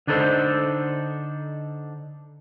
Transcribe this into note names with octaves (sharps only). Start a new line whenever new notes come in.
D3 D4 D#4 A4 C5